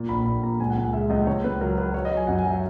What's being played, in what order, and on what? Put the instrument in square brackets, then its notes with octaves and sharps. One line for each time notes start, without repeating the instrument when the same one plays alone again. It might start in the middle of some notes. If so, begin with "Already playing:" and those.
Already playing: [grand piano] A#2
A#1 B5
A#1 B5
A#2 A#5
C#2 G#5
F#5
C#2 G#5
G#3 E5
C#2 D#5
C#2 C#5
C#2 B4
F#3 A#4
F#3 B4
F#3 C#5
D#5
F#3
G#5
F#2 F#5
G#5
F#3
E5